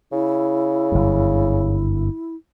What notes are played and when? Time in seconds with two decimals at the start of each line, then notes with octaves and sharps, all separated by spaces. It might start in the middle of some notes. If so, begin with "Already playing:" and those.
0.12 C#3 E4
0.92 G1 F#2